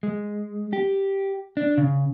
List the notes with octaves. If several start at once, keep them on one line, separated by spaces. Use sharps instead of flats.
G#3
G4
D4
C#3